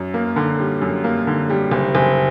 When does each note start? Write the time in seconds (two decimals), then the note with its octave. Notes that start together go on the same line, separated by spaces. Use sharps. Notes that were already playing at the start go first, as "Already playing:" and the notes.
Already playing: F#2
0.14 A#3
0.36 D3
0.59 G3
0.82 F#2
1.04 A#3
1.27 D3
1.50 G3
1.71 F#1
1.95 F#1